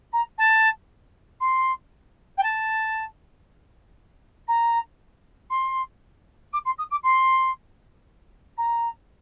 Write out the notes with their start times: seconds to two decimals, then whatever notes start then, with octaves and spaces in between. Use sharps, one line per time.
0.12 A#5
0.38 A5
1.40 C6
2.37 G5
2.43 A5
4.47 A#5
5.50 C6
6.53 D6
6.65 C6
6.78 D#6
6.90 D6
7.03 C6
8.57 A#5